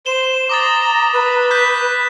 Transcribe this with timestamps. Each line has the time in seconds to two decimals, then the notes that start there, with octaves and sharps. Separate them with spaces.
0.06 C5 E7 G7
0.49 A#5 D6 D#6 A6
1.13 B4
1.51 F#6 G6 B6